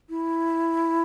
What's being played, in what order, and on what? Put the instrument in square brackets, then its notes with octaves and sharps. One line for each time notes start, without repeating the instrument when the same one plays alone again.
[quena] E4